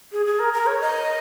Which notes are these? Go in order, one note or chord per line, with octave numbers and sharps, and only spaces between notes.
G#4
G#4
A#4
A#4
C#5
D#5